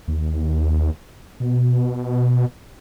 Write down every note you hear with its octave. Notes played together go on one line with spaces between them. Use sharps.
D#2
B2